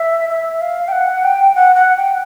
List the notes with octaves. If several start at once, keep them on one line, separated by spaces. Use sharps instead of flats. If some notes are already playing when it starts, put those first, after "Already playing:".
Already playing: E5
E5
F5
G5
F#5
G5
F#5
F#5
G5